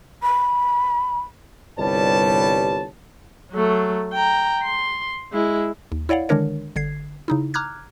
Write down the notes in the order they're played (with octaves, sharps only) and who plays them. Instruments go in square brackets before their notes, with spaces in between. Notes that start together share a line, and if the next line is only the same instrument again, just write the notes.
[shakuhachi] B5
[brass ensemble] G1 C2 G3 B4 C#5 A5
[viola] F#3 A3
G5 A#5
C6
G#3 E4
[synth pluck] D#2
E4 C#5 D5 F5 F#5
D3 D#3 G#3 D4 A#4 C#5
G1 D3 G#6 C7
C#3 D#4 E4
A#5 D6 F6 F#6 G#6